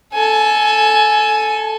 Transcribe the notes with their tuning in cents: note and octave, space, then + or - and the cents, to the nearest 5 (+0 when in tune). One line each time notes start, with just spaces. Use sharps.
A4 +0 G#5 +25